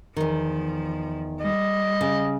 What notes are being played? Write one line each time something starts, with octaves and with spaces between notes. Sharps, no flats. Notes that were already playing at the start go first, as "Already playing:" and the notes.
E2 D#3 F3
G3 D#5
C#3